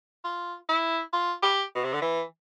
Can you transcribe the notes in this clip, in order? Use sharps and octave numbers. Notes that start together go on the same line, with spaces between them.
F4
E4
F4
G4
B2
C3
D3
E3